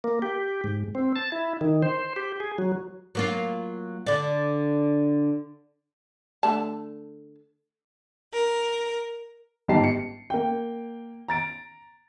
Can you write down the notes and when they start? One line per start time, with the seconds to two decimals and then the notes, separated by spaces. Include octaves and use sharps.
0.04 A#3
0.22 G4
0.64 G#2
0.95 C4
1.16 A5
1.32 E4
1.61 D#3
1.83 C5
2.16 G4
2.40 G#4
2.58 F#3
3.15 F#3 A#3 F4
4.06 D3 D5
6.43 D3 A3 A5
8.33 A#4
9.68 G1 G#2 D#4 G4 A5 C7
9.84 C#7
10.30 A#3 G5
11.28 A#5 A6 D7